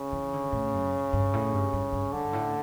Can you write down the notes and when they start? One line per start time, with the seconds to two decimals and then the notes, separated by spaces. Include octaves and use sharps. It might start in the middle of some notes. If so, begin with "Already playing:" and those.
Already playing: C#3
0.12 E3
0.33 D3
0.52 A2
0.73 F#2
1.13 G2
1.33 A2
1.53 G2
1.73 G2
1.93 G2
2.13 G2 D3
2.33 A2